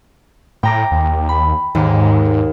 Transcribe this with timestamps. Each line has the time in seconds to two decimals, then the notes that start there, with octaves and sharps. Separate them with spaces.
0.63 A2 G5 A#5 D6
0.91 D#2
1.29 B5
1.75 D#2 G#2